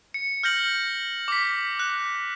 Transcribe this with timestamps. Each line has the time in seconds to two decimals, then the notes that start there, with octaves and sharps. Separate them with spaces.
0.14 C#7
0.43 F6 G6 A#6 F#7
1.28 D6 B6
1.79 F#6